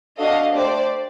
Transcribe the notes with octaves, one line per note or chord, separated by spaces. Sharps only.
D4 F#4 A4 D#5 F5
A3 D4 G4 C5 D5